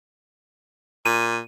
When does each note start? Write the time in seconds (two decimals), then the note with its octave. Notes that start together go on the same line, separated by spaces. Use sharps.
1.05 A#2 D#7